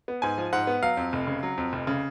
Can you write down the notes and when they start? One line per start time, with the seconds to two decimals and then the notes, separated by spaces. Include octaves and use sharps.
0.08 B3
0.22 G#2 G#5
0.38 F3
0.53 G#2 F#5
0.67 B3
0.82 F#3 F5
0.97 F2
1.13 F1
1.27 C#3
1.43 F#3
1.58 F2
1.73 F1
1.87 C#3